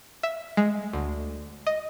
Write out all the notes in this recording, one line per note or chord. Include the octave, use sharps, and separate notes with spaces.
E5
G#3
D2
D#5